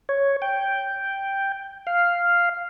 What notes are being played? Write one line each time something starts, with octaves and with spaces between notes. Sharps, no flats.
C#5
G5
F5